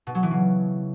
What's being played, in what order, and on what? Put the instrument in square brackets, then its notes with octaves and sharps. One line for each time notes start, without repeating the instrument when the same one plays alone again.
[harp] B2
F#3
E3
C#3